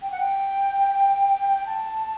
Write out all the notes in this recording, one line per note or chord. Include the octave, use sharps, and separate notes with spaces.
G5
F#5
G5
A5